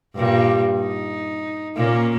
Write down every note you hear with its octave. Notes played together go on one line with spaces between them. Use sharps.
G2 A#2 G3
D#4
A#2 A#3 C#4